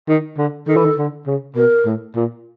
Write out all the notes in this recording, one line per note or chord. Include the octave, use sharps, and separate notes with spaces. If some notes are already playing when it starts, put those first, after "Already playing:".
D#3
D3
D#3 A4
E3
D#3
D3
C#3
B2 A#4
A2
A#2